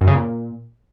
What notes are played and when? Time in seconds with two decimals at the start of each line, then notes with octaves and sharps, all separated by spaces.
0.01 F#2
0.07 C#3
0.14 A#2